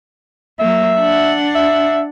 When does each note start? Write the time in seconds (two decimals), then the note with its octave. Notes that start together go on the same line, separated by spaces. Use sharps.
0.59 F#3 A#3 E5
1.00 D4 F#5
1.55 E5